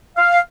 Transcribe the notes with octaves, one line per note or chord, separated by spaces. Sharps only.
F5